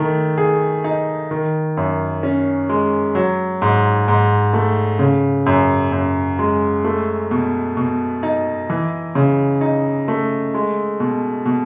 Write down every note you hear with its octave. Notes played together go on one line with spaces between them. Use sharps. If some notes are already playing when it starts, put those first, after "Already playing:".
Already playing: D#3 A3
G#4
D#4
D#3
F#2
C#4
G#3
F#3
G#2
G#2
A3
C#3
F#2
F#2
G#3
A3
B2
B2
D#4
E3
C#3
D#4
A3
G#3
B2
B2